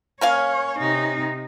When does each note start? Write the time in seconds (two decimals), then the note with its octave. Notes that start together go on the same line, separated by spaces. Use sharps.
0.21 A#3 C#4 C#5 F5
0.78 C3 D#4